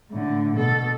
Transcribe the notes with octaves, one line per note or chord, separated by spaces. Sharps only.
A2 D3
B2 A4